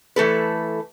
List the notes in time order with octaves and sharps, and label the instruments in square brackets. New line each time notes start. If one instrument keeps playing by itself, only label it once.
[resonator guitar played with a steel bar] E3 A3 A4 B4